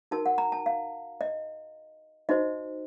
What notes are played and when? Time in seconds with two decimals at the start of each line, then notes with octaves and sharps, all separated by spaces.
0.11 D#4 F#4 A#4 A5
0.26 F#5
0.38 A#5
0.52 A5
0.66 F5
1.21 D#5
2.29 D#4 F#4 C5 D#5